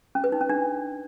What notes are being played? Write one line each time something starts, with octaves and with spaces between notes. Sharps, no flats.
C#4
B4
D#4
C#4
D4